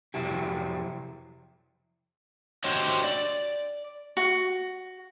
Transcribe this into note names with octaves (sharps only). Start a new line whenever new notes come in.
F2 C3 F#3 E4 G4
D4 F#4 G4 C5 C#5 D#5
D5
F#4